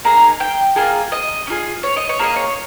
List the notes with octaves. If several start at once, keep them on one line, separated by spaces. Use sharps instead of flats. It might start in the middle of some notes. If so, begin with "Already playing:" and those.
A#3 D#4 G#4 A#5
G5
A#3 F4 G#4
D#5
C#4
F4 G#4
C#5
D#5
C#5
A#3 F4 G#4 D#5
C#5